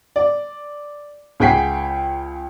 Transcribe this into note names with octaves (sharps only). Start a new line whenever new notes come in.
D5
C#2 G#4 F#5 G5 B6 C7